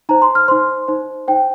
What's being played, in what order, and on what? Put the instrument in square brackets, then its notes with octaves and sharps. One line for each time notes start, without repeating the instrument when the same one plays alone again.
[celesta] D#4 C5 A#5
C6
F6
D#4 C5 C6
D#4 C5
D#4 C5 G5